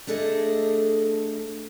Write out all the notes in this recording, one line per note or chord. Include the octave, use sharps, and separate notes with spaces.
A3 D4 G#4 A4 D#5